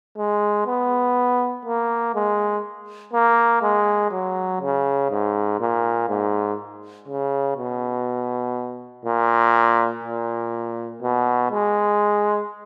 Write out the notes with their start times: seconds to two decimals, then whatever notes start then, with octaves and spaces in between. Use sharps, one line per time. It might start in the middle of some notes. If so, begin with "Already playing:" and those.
0.17 G#3
0.67 B3
1.65 A#3
2.15 G#3
3.13 A#3
3.62 G#3
4.12 F#3
4.61 C#3
5.11 G#2
5.60 A#2
6.09 G#2
7.08 C#3
7.57 B2
9.05 A#2
10.04 A#2
11.03 B2
11.52 G#3